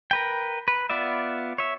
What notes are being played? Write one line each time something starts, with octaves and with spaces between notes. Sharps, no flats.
A#4 B4 G5
B4
B3 F4 D5 E5
C#5 E5